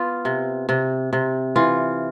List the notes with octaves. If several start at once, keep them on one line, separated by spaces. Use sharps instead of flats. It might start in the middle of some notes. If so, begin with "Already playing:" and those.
Already playing: B3 F4
C3
C3
C3
E3 F4